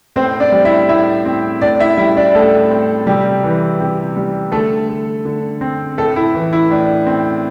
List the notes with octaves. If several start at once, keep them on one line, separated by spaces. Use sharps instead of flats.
A2 C4 C5
D4 D5
G3
E4 E5
A2 E4 E5
C4
A2 D4 D5
E4 E5
G3 E4 E5
D4 D5
A2 A3 A4
C4
C3 G3 G4
E3
C3
G3
D3 A3 A4
A3
D3
C4
A2 A3 A4
E4
E3
E4
A2 D4
C4